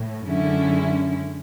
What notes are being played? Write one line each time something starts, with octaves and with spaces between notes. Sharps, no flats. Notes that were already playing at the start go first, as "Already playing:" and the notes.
Already playing: A2
F#2 D3 G#3 C#4 E4